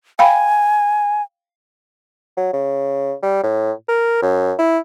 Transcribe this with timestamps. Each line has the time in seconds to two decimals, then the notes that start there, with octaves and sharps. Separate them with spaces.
0.19 F5 G5 G#5 B5
2.37 F#3
2.53 C#3
3.23 G3
3.43 A2
3.88 A#4
4.22 F#2
4.59 E4